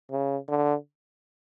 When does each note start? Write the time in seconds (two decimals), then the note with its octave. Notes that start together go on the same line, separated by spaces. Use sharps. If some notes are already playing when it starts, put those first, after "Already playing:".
0.11 C#3
0.48 D3